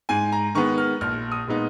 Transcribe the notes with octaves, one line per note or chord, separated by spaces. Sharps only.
G#2 G#5
A#5
D#3 G#3 B3 C#6
F6
A#1 F6
D#6
A#2 G#3 B3 D#4